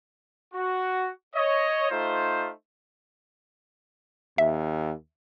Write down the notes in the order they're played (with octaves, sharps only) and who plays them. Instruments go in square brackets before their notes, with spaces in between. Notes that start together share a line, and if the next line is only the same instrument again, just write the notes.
[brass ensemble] F#4
C#5 D#5
A3 D#4 F4 C5
[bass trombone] D#2 [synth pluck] E5